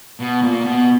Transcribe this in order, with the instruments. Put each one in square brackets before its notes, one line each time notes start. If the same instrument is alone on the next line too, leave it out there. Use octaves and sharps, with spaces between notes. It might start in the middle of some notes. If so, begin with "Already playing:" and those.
[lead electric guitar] B2
A#2
B2